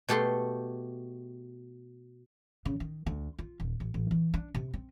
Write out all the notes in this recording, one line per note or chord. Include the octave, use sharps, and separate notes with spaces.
B2 A3 G4 A4 C6
C#3
D#3
D2
F4
D#1
A1
A1
E3
D4
C3
C4